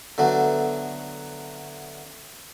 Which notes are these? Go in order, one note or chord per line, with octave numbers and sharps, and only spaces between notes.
D3 F#3 A3 B3